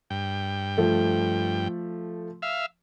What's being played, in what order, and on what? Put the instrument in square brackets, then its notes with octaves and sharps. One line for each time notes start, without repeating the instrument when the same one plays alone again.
[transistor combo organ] G2 G5
[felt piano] F3 A3
[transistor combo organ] E5 F5